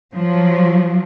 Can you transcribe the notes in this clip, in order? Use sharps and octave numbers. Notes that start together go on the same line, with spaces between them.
F3 F#3